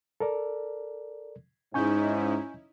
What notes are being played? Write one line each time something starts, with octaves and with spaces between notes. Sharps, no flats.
A4 A#4 D5
G#2 C#4 D#4 E4 G#5 C#6 G6